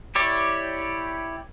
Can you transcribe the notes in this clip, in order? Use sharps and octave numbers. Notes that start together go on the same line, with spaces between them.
E4 G4 C#5 D5